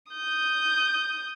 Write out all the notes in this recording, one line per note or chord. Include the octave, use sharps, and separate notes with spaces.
D#6 G6